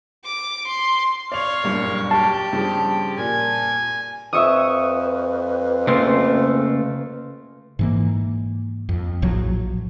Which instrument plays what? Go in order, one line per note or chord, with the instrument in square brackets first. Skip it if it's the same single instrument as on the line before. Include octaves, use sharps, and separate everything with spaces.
[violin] D6
C6
[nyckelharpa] C#5 F5 [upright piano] D5 F7
[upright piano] F#1 G2 A#2
[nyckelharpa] G4 [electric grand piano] A5
[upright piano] G2 C#3 F3
[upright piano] A#2 [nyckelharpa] G#5
[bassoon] F2 [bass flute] B4 [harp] E5 C#6 D#6
[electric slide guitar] C#3 A3 A#3 [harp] C6
[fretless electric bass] G#2 E3 A#3
F2
A#1 A2 F3 F#3